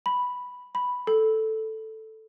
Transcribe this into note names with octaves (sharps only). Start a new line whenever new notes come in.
B5
B5
A4